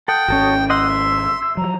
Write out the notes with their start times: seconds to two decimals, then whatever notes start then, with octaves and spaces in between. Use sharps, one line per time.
0.08 A4 F#5 G5 D#6
0.28 G#1 C#4 F#4 A4 C#5
0.70 D#5 F#5 C6 E6
0.90 E5
1.57 F3 F#3 A#5